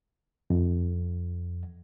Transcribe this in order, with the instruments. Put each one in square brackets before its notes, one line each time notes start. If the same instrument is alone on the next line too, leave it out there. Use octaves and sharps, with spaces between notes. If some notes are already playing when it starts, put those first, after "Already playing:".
[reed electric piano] F2